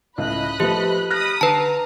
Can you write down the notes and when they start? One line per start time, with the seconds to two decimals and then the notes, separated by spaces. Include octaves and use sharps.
0.18 C#2 A2 C#3 D#5 B5 F#6
0.60 F3 A3 G4 B4
1.10 B5 D#6 F6 F#6 A#6
1.41 D3 B4 A5 A#5